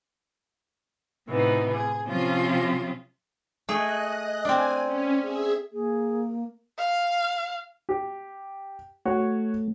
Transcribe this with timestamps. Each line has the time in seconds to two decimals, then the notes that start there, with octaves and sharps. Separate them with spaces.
1.27 A2 C3 E3 B3 D#4
1.73 G#4
2.07 C3 F3 C4 C#4 F4
3.69 A3 G#4 D#5 F#6
4.45 C4 D4 G#5
4.85 C#4
5.21 G#4 E5
5.72 A#3 G#4
6.78 F5
7.89 G4
9.05 A3 F#4 C#5